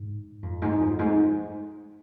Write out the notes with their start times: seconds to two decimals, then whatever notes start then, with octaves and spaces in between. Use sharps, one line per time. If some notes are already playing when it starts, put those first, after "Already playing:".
Already playing: G#2
0.43 F2
0.62 G#2
0.81 F2
0.99 G#2